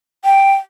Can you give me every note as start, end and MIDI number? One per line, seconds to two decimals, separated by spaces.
0.25 0.53 79